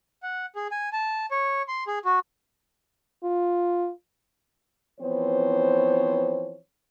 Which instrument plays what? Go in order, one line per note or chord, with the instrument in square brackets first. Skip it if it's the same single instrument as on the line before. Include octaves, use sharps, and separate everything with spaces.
[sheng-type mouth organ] F#5
G#4
G#5
A5
C#5
C6
G#4
F#4
[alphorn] F4
[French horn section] E3 F3 B3 C4 C5 C#5